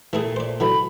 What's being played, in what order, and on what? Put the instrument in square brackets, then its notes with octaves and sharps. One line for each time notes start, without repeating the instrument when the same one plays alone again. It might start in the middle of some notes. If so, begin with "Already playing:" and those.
[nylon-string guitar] A#2 A3 [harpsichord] E3 E4 G#4
[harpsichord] C5 D5
[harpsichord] D3 E3 F#3 [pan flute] B5